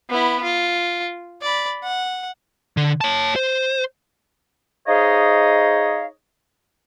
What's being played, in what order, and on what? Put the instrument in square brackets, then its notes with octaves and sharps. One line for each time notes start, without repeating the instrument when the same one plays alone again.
[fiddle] B3 E4
F4
D5 B5
F#5
[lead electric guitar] D3
C#5 A5
C5
[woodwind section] D#4 G#4 C5 C#5 D#5 F5